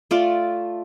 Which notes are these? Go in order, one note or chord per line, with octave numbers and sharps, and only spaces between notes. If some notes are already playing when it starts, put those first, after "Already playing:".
A3 F4 D5